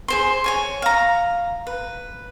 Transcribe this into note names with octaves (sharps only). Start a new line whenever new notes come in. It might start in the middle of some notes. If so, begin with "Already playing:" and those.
G#4 C5 C6
C#5 G#5 C#6
F5 A#5
B4